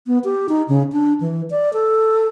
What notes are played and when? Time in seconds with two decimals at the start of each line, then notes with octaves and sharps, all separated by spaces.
0.07 B3
0.24 G4
0.49 D#4
0.68 C#3
0.92 D4
1.20 E3
1.50 D5
1.73 A4